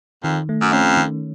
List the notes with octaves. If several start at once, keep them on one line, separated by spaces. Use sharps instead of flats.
F2 D#3
A3
F#2
F2 C#4
D#3